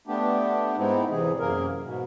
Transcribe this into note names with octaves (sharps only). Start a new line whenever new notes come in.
A3 B3 D4 G4
G#2 G#3 B3 C4 D#4 E4
E2 C3 E3 G#4
F#2 C3 A#3 G#4 A#4
G#2 B2